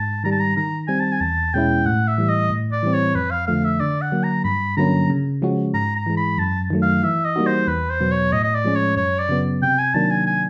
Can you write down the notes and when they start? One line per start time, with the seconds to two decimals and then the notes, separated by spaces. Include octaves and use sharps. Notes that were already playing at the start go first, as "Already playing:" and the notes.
Already playing: G#2 A5
0.24 D#3 G3 A#5
0.32 A5
0.40 A#5
0.57 D#3 A#5
0.88 G3 C4 G#5
1.00 A5
1.12 G#5
1.21 E2 A5
1.54 B2 G#3 C#4 E4 G5
1.86 A2 F#5
2.08 E5
2.18 E3 G3
2.29 D#5
2.50 A2
2.72 D5
2.83 E3 G3 C4
2.94 C#5
3.15 F2 B4
3.31 F5
3.47 D3 F3 A3 F5
3.64 E5
3.80 D3 D5
4.02 F#5
4.12 F#3 A#3
4.24 A#5
4.44 G2 B5
4.77 D3 F#3 A#3 C#4 A#5
5.10 C#3
5.42 F3 G#3 C#4 F#4
5.74 G#2 A#5
5.96 A#5
6.06 E3 G#3
6.17 B5
6.38 F#2 A5
6.70 D#3 F#3 A3
6.82 F5
7.03 E3 E5
7.25 D#5
7.36 G3 A#3 D#4 F#4
7.46 C5
7.67 E2 B4
7.90 C5
8.00 B2 F#3 B3
8.11 C#5
8.32 A2 D#5
8.44 D#5
8.54 D5
8.65 F3 G#3 C#4
8.76 C#5
8.97 F#2 C#5
9.19 D5
9.29 C#3 F#3 B3
9.62 C3 G5
9.78 G#5
9.94 D#3 F#3 A#3 D4 A5
10.11 G#5
10.27 G#5